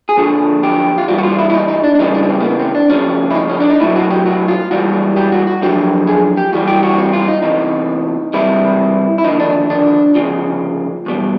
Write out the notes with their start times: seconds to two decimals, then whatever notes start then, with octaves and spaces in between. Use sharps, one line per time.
0.09 G#4
0.17 F2 D3 F3 A4
0.63 G4
0.98 F4
1.08 G2 E3 G3 F#4
1.19 F#4
1.23 F4
1.39 E4
1.50 E4
1.54 D#4
1.68 D#4
1.84 D4
1.95 D4
1.99 C#2 C#3 E3 G3 D#4
2.15 D4
2.23 C#4
2.29 C4
2.40 A#3
2.44 B3
2.60 C4
2.75 D4
2.90 F2 C#3 F3 C#4
3.30 E4
3.35 D#4
3.50 C#4
3.60 D4
3.70 D#4
3.80 B1 A2 F#3 E4
3.96 F#4
4.10 G4
4.26 F#4
4.48 F4
4.71 G#2 E3 G3 F#4
5.16 G4
5.32 F#4
5.47 F#4
5.62 F#2 D3 F3 G4
6.07 G#4
6.37 G4
6.53 G2 E3 G3 F#4
6.68 G4
6.83 F#4
6.98 C4
7.13 F4
7.28 D#4
7.43 E2 C3 E3 D#4
8.34 C#2 C3 E3 G3 E4
9.18 E4
9.24 D#2 D3 F3 D#4
9.40 D4
9.70 D4
10.15 D2 C#3 F3
11.06 E2 B2 G3